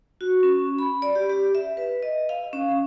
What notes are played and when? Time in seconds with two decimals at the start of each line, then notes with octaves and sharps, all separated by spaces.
0.21 F#4
0.43 C#4
0.79 B5
1.02 D5
1.15 G4
1.29 G4
1.55 E5
1.77 B4
2.03 D#5
2.29 F5
2.53 C#4